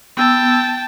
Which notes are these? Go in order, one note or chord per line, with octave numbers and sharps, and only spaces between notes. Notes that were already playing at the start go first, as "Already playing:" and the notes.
B3 G5 A5 E6